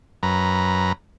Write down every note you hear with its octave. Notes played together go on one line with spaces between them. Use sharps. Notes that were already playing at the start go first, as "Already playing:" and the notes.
F#2 B4 A#5